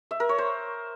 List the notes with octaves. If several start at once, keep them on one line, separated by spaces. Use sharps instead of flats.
E5
A#4
C#5
C5